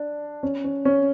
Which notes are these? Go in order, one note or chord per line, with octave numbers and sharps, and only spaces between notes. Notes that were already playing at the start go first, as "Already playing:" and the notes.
Already playing: D4
C#4
C#4
C#4